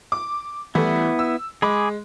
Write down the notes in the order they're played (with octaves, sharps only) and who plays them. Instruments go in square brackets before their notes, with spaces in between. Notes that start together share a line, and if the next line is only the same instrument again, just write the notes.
[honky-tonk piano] D6
[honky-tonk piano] E3 G3 A3 [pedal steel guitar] B3 E4
[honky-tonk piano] E6
[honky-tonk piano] G#3 [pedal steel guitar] G#4 B5 D6